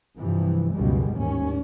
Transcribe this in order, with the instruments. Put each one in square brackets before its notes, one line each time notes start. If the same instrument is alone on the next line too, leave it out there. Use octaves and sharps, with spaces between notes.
[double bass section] G2 C3 E3 F3
C#2 F#2 B2 G3 G#3
A1 D#2 G#2 C#4